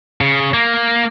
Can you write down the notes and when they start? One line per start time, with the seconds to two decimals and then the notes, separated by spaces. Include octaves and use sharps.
0.21 C#3
0.54 A#3